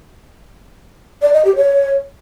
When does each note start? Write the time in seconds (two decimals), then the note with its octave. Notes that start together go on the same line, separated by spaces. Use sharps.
1.22 D5
1.33 D#5
1.45 G4
1.56 C#5